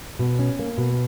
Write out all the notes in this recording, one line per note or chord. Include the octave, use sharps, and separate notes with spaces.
B2
C#4
A#3
B2